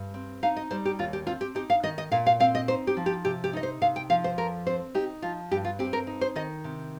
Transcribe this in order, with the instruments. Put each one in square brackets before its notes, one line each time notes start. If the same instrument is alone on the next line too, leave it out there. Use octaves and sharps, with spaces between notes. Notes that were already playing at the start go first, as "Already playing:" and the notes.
Already playing: [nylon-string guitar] G2
C4
D#4 F5
D#5
G3 C5
G4
D#2 F4
G4
C4 F4
G4
D#4 G4
F5
D#3 D#5
D#5
A#2 F5
F5
C4 F5
D#5
D#4 C5
G4
F3
G4
C3 G4
G4
D#4 D#5
C5
C3 F5
G5
F3 F5
C5
F2 A#4
C4 C5
D#4 G4
F3 F4
G2 G4
F4
C4 G4
A#4
D#4
C5
D#3 D#5
C3